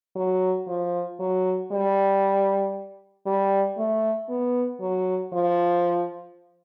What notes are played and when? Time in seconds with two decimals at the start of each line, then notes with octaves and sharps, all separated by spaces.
0.16 F#3
0.67 F3
1.20 F#3
1.72 G3
3.26 G3
3.78 A3
4.29 B3
4.81 F#3
5.33 F3